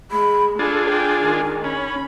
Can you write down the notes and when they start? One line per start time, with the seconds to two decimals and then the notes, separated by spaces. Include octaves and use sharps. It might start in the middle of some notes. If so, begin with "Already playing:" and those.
0.11 G#3 B5
0.59 D4 F4 G#4 A4 G#5
0.89 G5 A5
1.23 D#3 G#3
1.64 C#4 B5